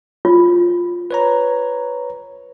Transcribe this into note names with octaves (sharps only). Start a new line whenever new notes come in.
F4
B4 C#5 A#5